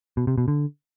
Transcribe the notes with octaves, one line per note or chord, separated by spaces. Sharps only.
B2
C3
B2
D3